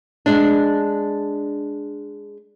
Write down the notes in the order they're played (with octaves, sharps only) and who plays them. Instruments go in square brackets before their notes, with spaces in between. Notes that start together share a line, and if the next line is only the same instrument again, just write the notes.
[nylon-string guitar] G#3 D4